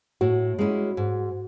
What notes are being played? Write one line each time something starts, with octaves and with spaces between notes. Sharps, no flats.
A2 F#4
G#3 C#4 E4
G#2